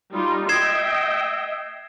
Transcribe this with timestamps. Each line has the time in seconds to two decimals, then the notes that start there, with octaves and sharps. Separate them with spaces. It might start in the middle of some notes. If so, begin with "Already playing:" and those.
0.12 G3 D#4 F4
0.49 D#5 E5 G5 G#6 C7 E7